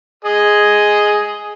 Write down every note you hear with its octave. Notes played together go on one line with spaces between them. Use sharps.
G#4 D#5